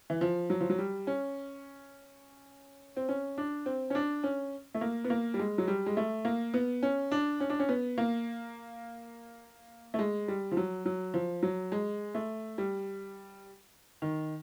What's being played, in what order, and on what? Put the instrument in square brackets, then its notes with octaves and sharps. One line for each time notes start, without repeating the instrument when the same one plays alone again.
[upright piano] E3
F3
F#3
F3
F#3
G3
C#4
C4
C#4
D4
C4
C#4
D4
C#4
A3
A#3
B3
A#3
G3
G#3
F#3
G3
G#3
A3
A#3
B3
C#4
D4
C#4
D4
C#4
B3
A#3
A3
G#3
G3
F3
F#3
F#3
F3
F#3
G#3
A3
G3
D#3